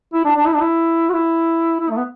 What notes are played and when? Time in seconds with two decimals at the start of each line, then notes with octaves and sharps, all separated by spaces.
0.14 E4
0.25 D4
0.36 D4
0.47 E4
0.54 D4
0.61 E4
1.10 F#4
1.14 E4
1.80 E4
1.90 A3
1.97 B3